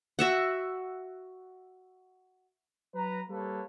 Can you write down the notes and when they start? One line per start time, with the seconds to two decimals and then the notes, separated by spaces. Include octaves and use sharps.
0.19 F#4 E5 F#5
2.95 F#3 B4 A#5
3.29 G3 A#3 A4 B4 C#5